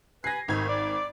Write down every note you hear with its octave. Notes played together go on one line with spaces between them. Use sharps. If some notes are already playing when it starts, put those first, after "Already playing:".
B4 G#5 A#6 C7
G#1 D#3 A3 D#4 G#6
D5 D6